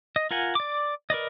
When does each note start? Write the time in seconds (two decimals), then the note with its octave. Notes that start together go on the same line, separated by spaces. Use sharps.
0.16 D#5
0.31 F4 A#4 F#5 G#5
0.55 D5 D6
1.10 A#4 B4 D5 D#5